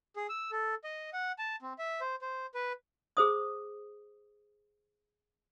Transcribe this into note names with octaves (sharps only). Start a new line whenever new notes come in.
G#4
E6
A4
D#5
F#5
A5
C4
E5
C5
C5
B4
G#4 C5 D#6